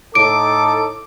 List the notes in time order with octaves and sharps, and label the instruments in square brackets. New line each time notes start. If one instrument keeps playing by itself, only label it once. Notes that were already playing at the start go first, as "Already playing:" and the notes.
[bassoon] A2 [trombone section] D#4 A4 [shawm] D6 [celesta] D7